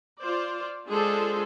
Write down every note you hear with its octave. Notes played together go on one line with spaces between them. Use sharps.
F4 C5 D5
G#3 D4 F4 G#4 A4 C5